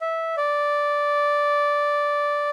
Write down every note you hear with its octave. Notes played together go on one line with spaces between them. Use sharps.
E5
D5